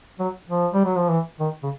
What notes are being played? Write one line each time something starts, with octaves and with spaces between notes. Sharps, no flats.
F#3
F3
G3
F#3
F3
E3
D#3
C#3